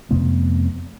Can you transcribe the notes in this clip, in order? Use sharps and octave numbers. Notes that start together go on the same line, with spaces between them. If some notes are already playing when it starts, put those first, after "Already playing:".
F2 C3 A3 B3